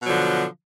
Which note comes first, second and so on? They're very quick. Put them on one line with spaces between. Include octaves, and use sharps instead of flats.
B2 F#3 F3 D3